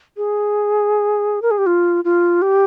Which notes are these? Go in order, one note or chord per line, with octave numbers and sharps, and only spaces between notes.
G#4
A#4
G#4
G4
F4
F4
G4